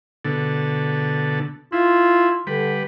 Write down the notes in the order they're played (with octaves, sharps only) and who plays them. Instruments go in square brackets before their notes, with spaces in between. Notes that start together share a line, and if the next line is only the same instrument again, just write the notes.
[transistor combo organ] B2 D3 A4
[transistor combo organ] E4 [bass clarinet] F4
[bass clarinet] D3 [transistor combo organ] G3 B4